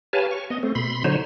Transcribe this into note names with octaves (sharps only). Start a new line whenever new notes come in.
G4 B4 C#5 F5 G#5 A5
C#6
B3 D#5
A3 C4
B2 B5 C6
D3 F#3 D#4 C5 C#5